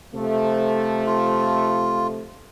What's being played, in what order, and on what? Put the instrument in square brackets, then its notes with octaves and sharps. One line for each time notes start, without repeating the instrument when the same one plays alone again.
[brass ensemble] C3 F3 A3
[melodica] F4